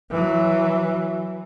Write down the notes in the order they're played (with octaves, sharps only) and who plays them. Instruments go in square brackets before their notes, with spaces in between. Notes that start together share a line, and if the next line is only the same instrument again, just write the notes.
[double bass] E3 F#3